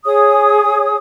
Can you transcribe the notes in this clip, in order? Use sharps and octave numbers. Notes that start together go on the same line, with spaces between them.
G#4 C#5 D#6